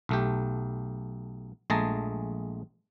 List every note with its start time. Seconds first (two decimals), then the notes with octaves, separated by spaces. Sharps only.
0.09 B1 A3 G4
1.70 A#1 G#3 A3 G#4 A5 A#5